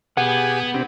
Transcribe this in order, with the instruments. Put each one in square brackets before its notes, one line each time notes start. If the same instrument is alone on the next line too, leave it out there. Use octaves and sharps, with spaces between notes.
[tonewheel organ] B2 [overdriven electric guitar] B3 [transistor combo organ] G4 G#4 G#5 [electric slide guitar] F#5
[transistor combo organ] C3 C4 G4 [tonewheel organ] D4 B4